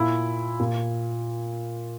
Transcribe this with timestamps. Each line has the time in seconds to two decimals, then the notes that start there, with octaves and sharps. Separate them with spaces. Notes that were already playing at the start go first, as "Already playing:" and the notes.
Already playing: A#2 E4
0.60 A#2